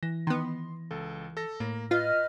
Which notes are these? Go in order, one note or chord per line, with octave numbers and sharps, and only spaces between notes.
E3 A#6
D#3 B3 C6
C#2 A4
A4 A#6
A2 A#3
F4 B4 D#5 F6